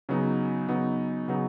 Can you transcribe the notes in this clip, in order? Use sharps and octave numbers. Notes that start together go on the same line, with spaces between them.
C#3 F#3 B3 D#4
C#3 F#3 B3 D#4
C#3 F#3 B3 D#4